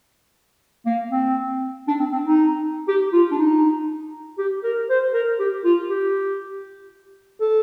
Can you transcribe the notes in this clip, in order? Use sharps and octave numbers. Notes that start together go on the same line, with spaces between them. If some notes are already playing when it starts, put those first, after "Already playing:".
A#3
C4
D4
C4
C4
D#4
G4
F4
D4
D#4
G4
A#4
C5
A#4
G4
F4
G4
A4